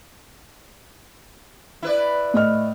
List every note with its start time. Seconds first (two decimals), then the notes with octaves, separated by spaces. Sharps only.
1.83 E4 B4 D5
2.34 A2 D#5 F6